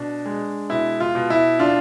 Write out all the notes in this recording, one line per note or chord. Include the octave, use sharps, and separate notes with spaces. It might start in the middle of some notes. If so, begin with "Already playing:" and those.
Already playing: B2 D4
G#3
B2 E4
F4
B2
E4
D4 F4